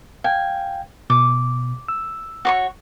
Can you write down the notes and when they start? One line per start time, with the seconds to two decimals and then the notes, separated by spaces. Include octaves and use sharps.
0.24 F5 G5 G#5
1.10 B2 D6
1.88 E6
2.45 F#4 C#5 C#6